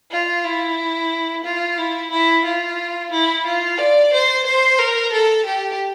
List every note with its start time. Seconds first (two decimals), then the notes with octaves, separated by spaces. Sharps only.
0.11 F4
0.44 E4
1.44 F4
1.77 E4
2.11 E4
2.45 F4
3.11 E4
3.46 F4
3.78 D5
4.13 C5
4.46 C5
4.79 A#4
5.13 A4
5.45 G4